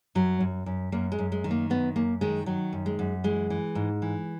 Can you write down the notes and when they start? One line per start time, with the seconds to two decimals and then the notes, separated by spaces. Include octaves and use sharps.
0.15 F#2 F#3
0.40 F#2
0.66 F#2
0.92 F#2 A#3
1.12 G#3
1.18 F#2
1.32 G#3
1.44 D#3
1.51 A#3
1.70 F#2 B3
1.96 F#2 A#3
2.21 D#3 G#3
2.46 D#3 F#3
2.73 F#2
2.86 G#3
2.99 F#2
3.24 E3 G#3
3.50 E3
3.75 G#2
4.02 E3